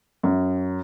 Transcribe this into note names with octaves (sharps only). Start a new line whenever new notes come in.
F#2